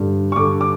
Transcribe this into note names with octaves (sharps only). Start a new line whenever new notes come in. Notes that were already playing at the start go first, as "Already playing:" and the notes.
Already playing: G2 D3
C#6
G2 D3 D6
D6